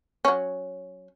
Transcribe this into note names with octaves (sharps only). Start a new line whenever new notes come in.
F#3 C#4